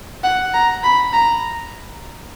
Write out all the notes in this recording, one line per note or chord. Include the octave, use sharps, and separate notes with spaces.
F#5
A#5
B5
A#5